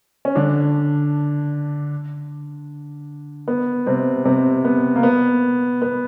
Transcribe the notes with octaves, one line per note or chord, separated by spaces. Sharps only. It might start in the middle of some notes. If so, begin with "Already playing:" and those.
C#4
D3 D4
B3
C3 C4
C3 C4
B3
A#3
B3
B3